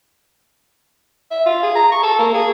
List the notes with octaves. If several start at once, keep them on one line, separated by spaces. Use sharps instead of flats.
E5
F4
G#4
A#5
C#6
A4
A#3
G#4